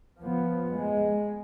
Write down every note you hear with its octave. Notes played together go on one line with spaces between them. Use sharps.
F3 B3
G#3